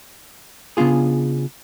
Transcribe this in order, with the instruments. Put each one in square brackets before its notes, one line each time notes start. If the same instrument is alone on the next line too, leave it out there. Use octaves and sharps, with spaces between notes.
[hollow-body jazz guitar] C#3 B3 D4 F4 G#4